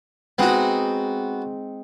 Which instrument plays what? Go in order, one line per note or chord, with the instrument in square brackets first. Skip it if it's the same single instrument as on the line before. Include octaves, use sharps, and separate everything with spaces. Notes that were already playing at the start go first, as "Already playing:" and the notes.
[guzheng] G#3 C4 D#4 [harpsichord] B3 F#4